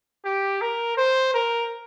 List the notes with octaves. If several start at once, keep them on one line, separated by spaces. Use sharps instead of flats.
G4
A#4
C5
A#4